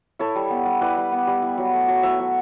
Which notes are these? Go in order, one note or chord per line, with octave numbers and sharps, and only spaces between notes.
E4 A4 C#5
G3
B3
G3
E4 B4 D5
G3
B3
G3
E4
F#3
A3
F#3
E4 C#5 E5
F#3